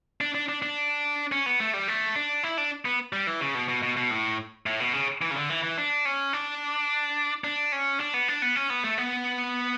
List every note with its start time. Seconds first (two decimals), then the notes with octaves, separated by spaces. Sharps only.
0.21 D4
0.35 D4
0.49 D4
0.62 D4
1.32 C#4
1.46 B3
1.60 A3
1.74 G3
1.88 A3
2.16 D4
2.43 E4
2.58 D4
2.85 B3
3.13 G3
3.27 E3
3.41 C#3
3.55 B2
3.69 B2
3.83 B2
3.97 B2
4.11 A2
4.66 A2
4.80 B2
4.94 C#3
5.22 E3
5.31 C#3
5.36 D3
5.50 E3
5.63 E3
5.78 D4
6.05 C#4
6.33 D4
7.44 D4
7.72 C#4
8.00 D4
8.14 B3
8.28 D4
8.42 B3
8.56 C#4
8.70 B3
8.84 A3
8.98 B3